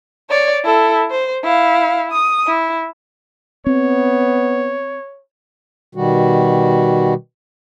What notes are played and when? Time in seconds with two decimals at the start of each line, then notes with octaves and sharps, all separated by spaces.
0.30 C#5 D5
0.64 E4 A4
1.11 C5
1.44 E4 F5
2.12 D#6
2.47 E4
3.66 B3 C4 C#5
5.95 B2 D#3 G3 F#4